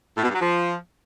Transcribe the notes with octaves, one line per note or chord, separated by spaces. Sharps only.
A2
B2
G2
F#3
F3